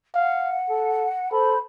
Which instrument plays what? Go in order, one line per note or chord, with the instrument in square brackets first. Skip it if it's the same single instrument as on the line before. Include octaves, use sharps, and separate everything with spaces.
[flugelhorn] F5 [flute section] F#5
[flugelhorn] A4
[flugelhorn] A4 [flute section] C5 B5